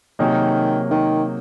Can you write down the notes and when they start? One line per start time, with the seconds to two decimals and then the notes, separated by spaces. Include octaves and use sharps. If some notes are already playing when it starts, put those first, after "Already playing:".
0.19 C3 D#3 F#3 A#3 D#4 G#4
0.91 D#3